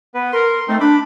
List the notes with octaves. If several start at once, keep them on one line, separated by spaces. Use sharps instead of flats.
B3 B4
A#4 C6
A3 C4 D#4
D4 B5 D6